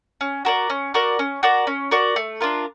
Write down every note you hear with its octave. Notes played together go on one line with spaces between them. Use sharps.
C#4
F#4 A#4 D5
C#4
F#4 A#4 D5
C#4
F#4 A#4 D5
C#4
F#4 A#4 D5
A3
D4 F4 A#4